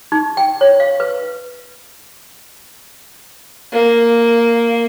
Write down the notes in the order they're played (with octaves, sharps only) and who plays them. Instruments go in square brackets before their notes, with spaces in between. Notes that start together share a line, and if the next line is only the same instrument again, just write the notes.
[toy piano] D#4
G5
C#5
F5
B4
[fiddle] A#3